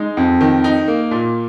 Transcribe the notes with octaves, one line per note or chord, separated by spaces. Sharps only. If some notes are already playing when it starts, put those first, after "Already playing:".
Already playing: G#3 D#4
F2
D#3
D#4
A#3
A#2